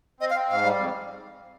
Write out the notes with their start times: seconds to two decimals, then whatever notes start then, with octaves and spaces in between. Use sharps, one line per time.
0.20 C4 D#5
0.30 F5
0.35 C4
0.50 G#2 F5
0.64 G3
0.79 F2